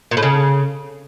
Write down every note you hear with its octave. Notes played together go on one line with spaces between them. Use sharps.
A#2
A2
C#3